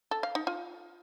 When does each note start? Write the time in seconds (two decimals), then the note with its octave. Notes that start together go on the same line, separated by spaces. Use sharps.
0.11 A4
0.23 F5
0.35 D#4
0.47 F4